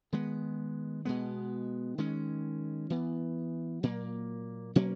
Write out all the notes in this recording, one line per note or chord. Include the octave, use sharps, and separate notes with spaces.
D#3 G#3 B3
B2 G#3 B3
D#3 G#3 C#4
E3 B3
A#2 F#3 A#3
B2 F#3 A#3 C#4